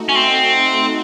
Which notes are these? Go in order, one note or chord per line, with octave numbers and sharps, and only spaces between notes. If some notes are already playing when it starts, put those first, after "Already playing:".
Already playing: A3 D#4 F#4
C#4
C4